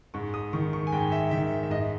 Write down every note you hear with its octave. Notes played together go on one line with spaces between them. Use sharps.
G#2 C#6
D#6
D#3 C#6
C#6
G#5
G#2 G5
E5
D#3 E5
E5
G#2 D#5